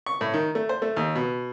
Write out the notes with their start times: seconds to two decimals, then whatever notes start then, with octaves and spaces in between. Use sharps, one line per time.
0.06 C#6
0.21 A2
0.34 D#3
0.55 A3
0.69 C5
0.82 A3
0.97 D#2
1.15 B2